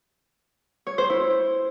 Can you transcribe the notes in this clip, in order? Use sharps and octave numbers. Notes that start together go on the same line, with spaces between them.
C#5
C5
E4